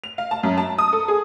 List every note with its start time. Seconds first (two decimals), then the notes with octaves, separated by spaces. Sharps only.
0.04 F7
0.18 F5
0.31 A5
0.43 F#2
0.58 A5
0.79 D#6
0.93 A4
1.08 G#4